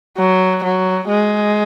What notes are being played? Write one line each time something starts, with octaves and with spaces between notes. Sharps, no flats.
F#3
F#3
G#3